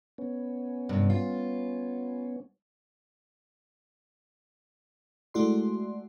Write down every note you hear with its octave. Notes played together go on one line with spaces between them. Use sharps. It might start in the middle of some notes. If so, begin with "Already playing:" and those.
B3 C#4
G2 C3
F4
G#3 A3 E4 F#4 D5 C6